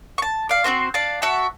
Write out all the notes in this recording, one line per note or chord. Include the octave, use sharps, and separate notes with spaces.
A5 C#6
D5 F5
C4 D4 F#4 C5
D4 D5 F5 A5
F#4 E5 F#5 A5